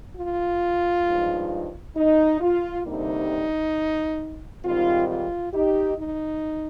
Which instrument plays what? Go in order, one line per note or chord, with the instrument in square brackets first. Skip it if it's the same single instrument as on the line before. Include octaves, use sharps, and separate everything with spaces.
[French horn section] F4
G2 F3 G#3 D#4
D#4
F4
D2 C3 G3 A#3 D4 D#4
G#2 D#3 G3 C4 F4
F4
D#4 G4
D#4